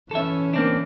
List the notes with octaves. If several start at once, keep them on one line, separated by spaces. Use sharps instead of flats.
E3 C#4 A4 E5
A#3 C4 D4